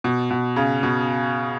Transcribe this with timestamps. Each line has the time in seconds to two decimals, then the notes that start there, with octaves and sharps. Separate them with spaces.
0.04 B2
0.31 B2
0.56 C#3
0.83 B2